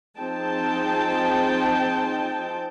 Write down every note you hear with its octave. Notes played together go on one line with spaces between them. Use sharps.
F3 C4 D#4 G#4 G5 A5